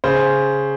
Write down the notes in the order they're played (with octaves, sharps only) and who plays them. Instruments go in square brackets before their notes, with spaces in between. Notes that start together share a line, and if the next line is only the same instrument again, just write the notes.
[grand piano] C#3 C5